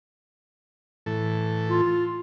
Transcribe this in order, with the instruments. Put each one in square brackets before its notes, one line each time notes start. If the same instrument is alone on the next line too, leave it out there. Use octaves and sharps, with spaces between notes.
[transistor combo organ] A2 E3 A4
[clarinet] F4